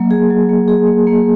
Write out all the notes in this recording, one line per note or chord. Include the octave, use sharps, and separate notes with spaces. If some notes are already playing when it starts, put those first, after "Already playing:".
Already playing: F#3 A#3
G#4
F#3
A#3
G#4
A#3
A#3